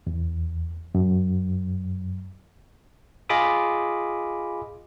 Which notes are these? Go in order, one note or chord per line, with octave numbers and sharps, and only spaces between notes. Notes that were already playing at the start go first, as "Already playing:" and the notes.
E2
F#2
F4 G#4 D#5 B5 D6 D#6